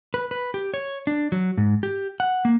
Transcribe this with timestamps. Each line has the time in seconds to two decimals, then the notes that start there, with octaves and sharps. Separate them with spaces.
0.14 B4
0.31 B4
0.54 G4
0.74 C#5
1.07 D4
1.32 F#3
1.57 G#2
1.83 G4
2.20 F#5
2.45 A#3